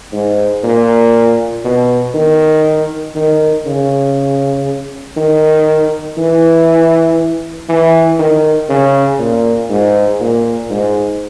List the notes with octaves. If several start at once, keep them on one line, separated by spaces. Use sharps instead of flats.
G#2
A#2
B2
D#3
D#3
C#3
D#3
E3
E3
D#3
C#3
A#2
G#2
A#2
G#2